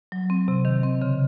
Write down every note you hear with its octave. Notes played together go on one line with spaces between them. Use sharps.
F#3
C4
C3
D#3
C4
C#3